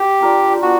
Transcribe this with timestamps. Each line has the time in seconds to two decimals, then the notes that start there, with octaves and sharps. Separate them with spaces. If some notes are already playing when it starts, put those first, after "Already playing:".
Already playing: G4
0.20 D4 F4 A#4 D5
0.62 B3 D4 F#4 G4